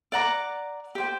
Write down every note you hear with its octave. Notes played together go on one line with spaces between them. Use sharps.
D5 F#5 A#5 D6
G4 C5 G5